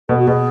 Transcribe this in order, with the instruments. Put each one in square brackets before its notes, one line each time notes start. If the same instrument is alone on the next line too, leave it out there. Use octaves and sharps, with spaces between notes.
[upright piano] B2 [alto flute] A4
[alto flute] F#4
[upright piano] B2 [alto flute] G#4